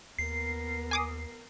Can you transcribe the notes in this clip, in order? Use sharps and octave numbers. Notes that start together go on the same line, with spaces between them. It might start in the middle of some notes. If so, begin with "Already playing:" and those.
D#2 B3 A#4 C7
G#5 D6 D#6